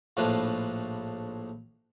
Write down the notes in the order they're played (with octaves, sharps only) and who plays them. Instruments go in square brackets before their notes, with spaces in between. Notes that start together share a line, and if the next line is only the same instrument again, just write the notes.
[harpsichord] A#1 A2 F3 D4 B4